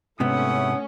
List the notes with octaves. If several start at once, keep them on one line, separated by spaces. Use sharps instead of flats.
G#2 C3 A3 B3 C#4 E4 F#5 D#6